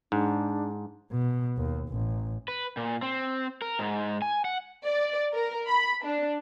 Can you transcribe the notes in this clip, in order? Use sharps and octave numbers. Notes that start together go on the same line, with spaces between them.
G#2 D4
B2
D#2
A1
B4
A#2
C4
A#4
G#2
G#5
F#5
D5
A#4
B5
D4